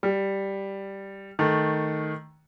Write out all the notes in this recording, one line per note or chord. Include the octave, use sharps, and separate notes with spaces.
G3
D#3 A3